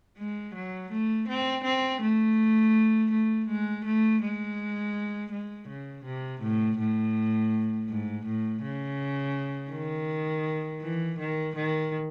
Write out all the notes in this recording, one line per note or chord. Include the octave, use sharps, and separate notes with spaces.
G#3
F#3
A3
C4
C4
A3
A3
G#3
A3
G#3
G#3
C#3
C3
A2
A2
G#2
A2
C#3
D#3
E3
D#3
D#3